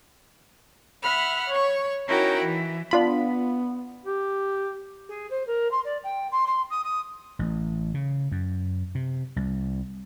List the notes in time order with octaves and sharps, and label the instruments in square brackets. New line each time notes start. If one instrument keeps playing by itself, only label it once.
[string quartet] E5 F#5 B5 F6
C#5 C#6
C#4 D#4 E4 F#4 A#4 G5
E3
[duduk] B3 [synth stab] D4 F4 B5
[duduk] G4
[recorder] G#4
C5
A#4
C6
D5
G5
C6
C6
D#6
D#6
[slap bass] A1
C#3
F#2
C3
C2